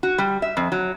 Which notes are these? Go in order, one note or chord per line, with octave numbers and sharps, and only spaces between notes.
F#4
G3
E5
F2
F#3